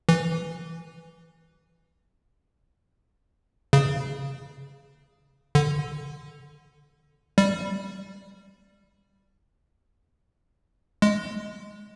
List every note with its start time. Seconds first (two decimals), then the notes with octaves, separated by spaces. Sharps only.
0.09 E3
3.73 C#3
5.55 D3
7.38 G3
11.02 G#3